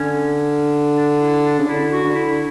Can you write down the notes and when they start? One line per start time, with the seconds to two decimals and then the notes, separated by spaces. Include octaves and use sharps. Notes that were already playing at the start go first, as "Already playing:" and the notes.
Already playing: D3 C#4
0.93 D4
1.18 E4
1.42 D4
1.59 C#3
1.66 D3 E4
1.91 F#4
2.04 D3
2.15 E4